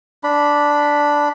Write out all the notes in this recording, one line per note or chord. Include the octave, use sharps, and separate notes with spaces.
D4 B5